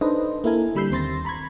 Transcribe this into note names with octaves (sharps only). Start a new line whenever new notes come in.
D4 D#4 A4 B4 C5 D#5
A#3 E4 A4 A#4 G#5
D3 G3 B5 E6 G6 C7
D#2 C4 C6 A6 A#6
A#5 B5 C#6 G#6